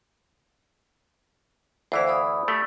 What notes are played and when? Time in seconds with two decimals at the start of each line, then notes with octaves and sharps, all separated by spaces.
1.92 D2 E3 E4 C5 D5 F5
2.08 D5 B5 D#6
2.48 A3 G4